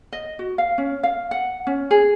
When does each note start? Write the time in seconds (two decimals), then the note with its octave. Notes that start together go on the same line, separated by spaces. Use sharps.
0.12 D#5
0.39 F#4
0.58 F5
0.78 C#4
1.03 F5
1.31 F#5
1.67 C#4
1.91 G#4